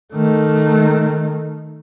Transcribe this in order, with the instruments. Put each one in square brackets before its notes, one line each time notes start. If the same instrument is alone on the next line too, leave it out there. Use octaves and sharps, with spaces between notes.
[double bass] D#3 A3